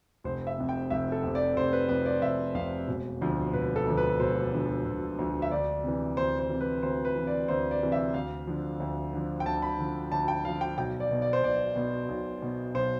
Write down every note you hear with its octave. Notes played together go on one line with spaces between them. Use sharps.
F1 C5
E5
F2 C3
G5
F1 E5
A4
F2 C3
D5
F1 C5
B4
F2 C3 B4
D5
F1 E5
F2 C3 F5
E1
D2 D3 F3
E1 B4
A4
D2 D3 F3
B4
E1 C5
D2 D3 F3
E1
D2 D3 F3
E5
D2 D5
C3 E3
D2 C5
C5
C3 E3
B4
D2 C5
B4
C3 E3
D5
D2 C5
D5
C3 E3
E5
D2 F5
D3 F3
D2
D3 F3
G5
D2 A5
B5
D3 F3
D2 A5
G5
D3 F3 F5
G5
B1 G5
D5
B2
D5
C5
B1 D5
B2
B1
B2
B1 C5